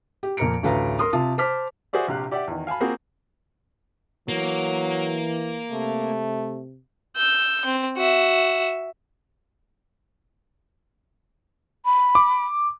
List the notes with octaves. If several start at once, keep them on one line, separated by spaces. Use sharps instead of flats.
G4
F2 A#2 A#4 A#5 C#7 D7
A1 D2 A4 B4 F5 A#5
A#4 C6 D#6
C3 F4 A5 D#6
C5 A5 D6 F6 B6
F#4 G#4 C5 D5 E5
A#1 C3 G4 F5 F#6
G4 D5 E5 F#5 G5
E2 D#3
F5 G#5 A5 B5
A#3 C4 F4 F#4 G#4
E3 F#3 A#3
C3 A3
E6 G6
C4
F#4 E5
B5
D6